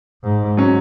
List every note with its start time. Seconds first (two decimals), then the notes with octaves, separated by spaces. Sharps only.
0.24 G#2
0.57 F#3 C#4